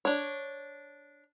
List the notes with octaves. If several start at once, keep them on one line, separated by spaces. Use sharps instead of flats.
D4 C#5